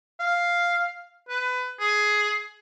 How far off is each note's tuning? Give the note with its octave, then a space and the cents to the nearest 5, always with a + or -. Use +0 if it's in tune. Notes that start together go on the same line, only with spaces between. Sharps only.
F5 +0
B4 +25
G#4 +10